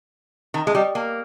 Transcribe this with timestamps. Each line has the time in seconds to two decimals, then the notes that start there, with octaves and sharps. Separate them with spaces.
0.54 D#3
0.67 G#3
0.75 G3
0.95 A#3